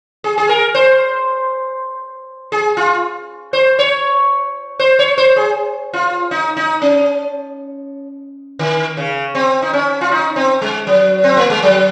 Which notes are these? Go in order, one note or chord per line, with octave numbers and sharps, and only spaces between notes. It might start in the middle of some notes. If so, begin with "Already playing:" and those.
G#4
G#4
A#4
C5
G#4
F4
C5
C#5
C5
C#5
C5
G#4
F4
D#4
D#4
C#4
D#3
C#3
C4
D#4
C#4
F4
D#4
C4
G#3
F#3
C4
A#3
G#3
F#3